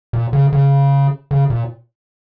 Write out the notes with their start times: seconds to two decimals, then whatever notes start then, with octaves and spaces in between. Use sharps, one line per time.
0.13 A#2
0.33 C#3
0.53 C#3
1.31 C#3
1.50 A#2